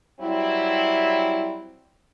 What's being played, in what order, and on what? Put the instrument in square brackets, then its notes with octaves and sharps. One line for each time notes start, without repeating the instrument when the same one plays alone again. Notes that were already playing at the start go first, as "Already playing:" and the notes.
[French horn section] F#3 G3 C4 E4